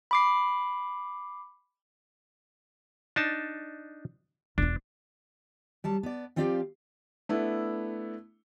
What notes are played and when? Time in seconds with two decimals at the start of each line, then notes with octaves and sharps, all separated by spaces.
0.11 B5 D6 C7
3.16 D4 D#4 A5
4.58 E1 D4 F4
5.84 F#3 G3 A5
6.03 B3 D5
6.36 F3 C4 F4 G4 D5 F5
7.29 A3 B3 D4 E4